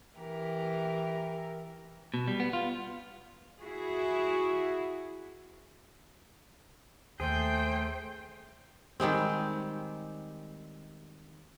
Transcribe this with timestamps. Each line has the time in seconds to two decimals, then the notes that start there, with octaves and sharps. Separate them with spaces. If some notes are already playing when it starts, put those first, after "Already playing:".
0.18 E3 G4 A#4
2.14 B2
2.28 G3
2.40 B3
2.53 F4
3.60 E4 F#4 G#4
7.20 D#2 A3 G#4 C5 G5
9.00 D#3 G3 G#3 C4